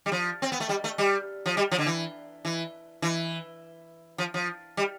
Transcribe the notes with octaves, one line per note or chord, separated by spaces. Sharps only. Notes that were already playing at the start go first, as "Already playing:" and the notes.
G3
F3
C4
B3
A3
G3
A3
G3
F3
G3
F3
D3
E3
E3
E3
F3
F3
G3